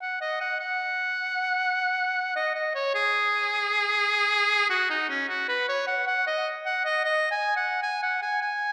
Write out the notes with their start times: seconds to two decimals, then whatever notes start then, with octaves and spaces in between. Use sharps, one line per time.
0.01 F#5
0.21 D#5
0.41 F#5
0.60 F#5
2.36 D#5
2.55 D#5
2.75 C#5
2.95 G#4
4.70 F#4
4.90 D#4
5.09 C#4
5.29 F#4
5.49 B4
5.69 C#5
5.87 F#5
6.07 F#5
6.27 D#5
6.66 F#5
6.85 D#5
7.04 D#5
7.31 G#5
7.56 F#5
7.83 G#5
8.03 F#5
8.22 G#5
8.42 G#5